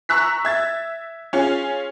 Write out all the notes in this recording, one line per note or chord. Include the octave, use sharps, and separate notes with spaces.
A#5 C#6 E6 F#6 B6
E5 G#6 A6
C#4 F4 G#4